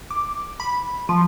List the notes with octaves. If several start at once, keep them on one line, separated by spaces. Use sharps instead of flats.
D6
B5
F3